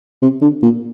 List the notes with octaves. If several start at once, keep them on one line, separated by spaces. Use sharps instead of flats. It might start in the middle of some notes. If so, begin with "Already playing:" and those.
C3
D3
A#2